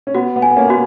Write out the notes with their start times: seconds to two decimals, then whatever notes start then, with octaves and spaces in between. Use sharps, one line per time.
0.07 C#4
0.15 B3 F#4
0.36 B3
0.42 G#5
0.51 B3
0.57 A#3 C#4
0.69 B3 F#4